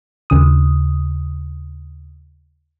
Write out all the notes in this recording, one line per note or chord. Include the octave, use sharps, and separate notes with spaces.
D#2 C#3 D#6